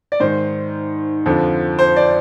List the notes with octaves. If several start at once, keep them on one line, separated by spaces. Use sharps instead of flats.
D5
G#2 D#3 C5
F2 D3 F3
C5
D5